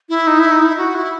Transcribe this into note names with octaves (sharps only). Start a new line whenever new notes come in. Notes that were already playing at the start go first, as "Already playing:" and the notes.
E4
D#4
E4
D#4
E4
F#4
E4